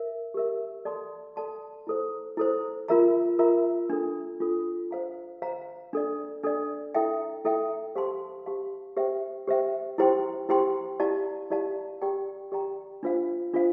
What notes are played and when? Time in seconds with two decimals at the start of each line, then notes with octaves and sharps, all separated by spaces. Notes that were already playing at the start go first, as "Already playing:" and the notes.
Already playing: A#4 E5
0.34 G4 A#4 E5
0.85 A4 D5 A5 C6
1.36 A4 D5 A5 C6
1.87 E4 A4 C5
2.37 E4 A4 C5
2.88 F4 A#4 E5 A#5
3.39 F4 A#4 E5 A#5
3.90 D4 F4 A4
4.40 D4 F4 A4
4.91 C5 F5 A#5
5.42 C5 F5 A#5
5.93 D4 A4 D5
6.43 D4 A4 D5
6.95 E4 A4 E5 G5
7.45 E4 A4 E5 G5
7.95 G4 C5 F5 A5 C6
8.46 G4 C5 F5 A5 C6
8.96 G4 C5 E5 G5
9.48 G4 C5 E5 G5
9.98 E4 G4 C5 G5 C6
10.49 E4 G4 C5 G5 C6
11.00 E4 G4 D5 F5 A5
11.50 E4 G4 D5 F5 A5
12.02 G4 D5 G5 A#5
12.52 G4 D5 G5 A#5
13.03 D4 F4 C5 F5
13.54 D4 F4 C5 F5